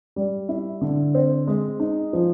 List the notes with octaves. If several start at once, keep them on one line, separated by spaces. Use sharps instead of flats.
G3
E4
D3
C4
G#3
D#4
F3